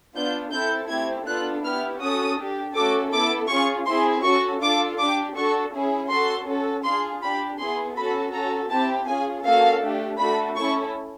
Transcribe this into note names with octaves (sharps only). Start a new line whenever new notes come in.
B3 D4 F4 G6
C4 E4 A4 G6
A3 C4 E4 G4 G#6
B3 D4 F4 A4 F#6
B3 E4 G4 F6
C#4 F#4 A4 D#6
D4 G4
A3 C#4 F#4 A4 D6
B3 E4 A4 D6
C#4 F4 G#4 C#6
C4 E4 G#4 C6
C#4 F#4 A4 C#6
D4 F4 A4 D6
D4 G4 D6
D4 F#4 A4 C#6
C#4 E4 G#4
C#4 F#4 A4 C6
C#4 F#4 A4
D4 F4 G#4 C6
D4 G4 B5
B3 E4 G#4 C6
C#4 F#4 A4 B5
C#4 F#4 A4 A#5
C4 E4 G4 A5
C#4 F4 G#4 G#5
A#3 C#4 F#4 A4 F5
A3 D4 G4
A3 D4 F#4 A4 B5
C#4 E4 A4 C#6